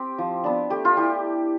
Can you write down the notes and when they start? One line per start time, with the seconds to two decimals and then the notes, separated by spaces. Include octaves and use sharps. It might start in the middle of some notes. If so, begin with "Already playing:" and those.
Already playing: C4 G4
0.18 F3
0.44 B3 D4
0.70 A3 G4
0.85 F4
0.97 E4 G4